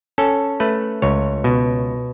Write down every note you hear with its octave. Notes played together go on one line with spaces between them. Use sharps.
C#4 A4
A3 B4
C#2 C#5
B2